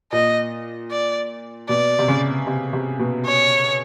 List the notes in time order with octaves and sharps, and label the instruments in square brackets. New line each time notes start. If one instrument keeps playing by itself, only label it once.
[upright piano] A#2 [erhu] D#5
[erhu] D5
[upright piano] B2 [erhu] D5
[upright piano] C3
C#3
C3
C3
B2
[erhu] C#5